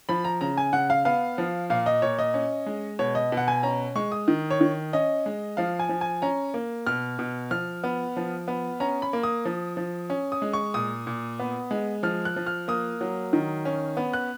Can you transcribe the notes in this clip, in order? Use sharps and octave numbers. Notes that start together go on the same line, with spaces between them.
F3 B5
A#5
C#3 A#5
G#5
C#3 F#5
F5
B3 F5
F3
A#2 F5
D#5
A#2 C#5
D#5
C#4
G#3
B2 C#5
D#5
B2
F#5
G#5
C#4 A#5
G#3 C#6
D#6
D#3
C#5
D#3
C#4 D#5
G#3
F3 F5
G#5
F3
G#5
C#4 A#5
A#3
B2 F6
B2
F3 F6
B3
F3
B3
C#4 A#5
B5
A#3
D#6
F3
F3
C#4
D#6
G#3
C#6
A#2 D#6
A#2
B3
G#3
F3 F6
F#6
F3
F6
A#3 D#6
F#3
D#3
C#4
B3
F#6